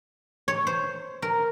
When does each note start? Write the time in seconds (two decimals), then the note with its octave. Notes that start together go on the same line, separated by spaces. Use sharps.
0.48 C#5
0.67 C5
1.22 A#4